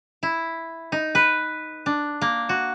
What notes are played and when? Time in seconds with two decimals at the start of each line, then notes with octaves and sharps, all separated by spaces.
0.23 E4
0.92 D#4
1.15 B4
1.86 D4
2.22 A#3
2.49 F#4